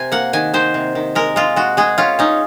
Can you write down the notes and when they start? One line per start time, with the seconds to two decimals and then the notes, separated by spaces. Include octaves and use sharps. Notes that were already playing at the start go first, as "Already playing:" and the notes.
Already playing: C3 G#5
0.12 A#3 F#5
0.33 D#3 G#5
0.54 D#3 C5
0.74 C3
0.95 D#3
1.15 G#3 A#4
1.36 G#3 F4
1.56 G#3 F#4
1.77 G#3 G#4
1.98 C#4 F4
2.19 C#4 D#4